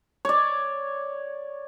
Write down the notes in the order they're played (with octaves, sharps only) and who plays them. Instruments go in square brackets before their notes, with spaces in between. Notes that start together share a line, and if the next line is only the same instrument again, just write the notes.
[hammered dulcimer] C#5 D5